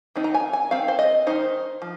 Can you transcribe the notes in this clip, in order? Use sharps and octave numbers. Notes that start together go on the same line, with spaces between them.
D#3 C4 D#4
A#5
G#5
G#5
D#3 C4 F5
C5
D#5
D#3 C4 D#4 C5
F3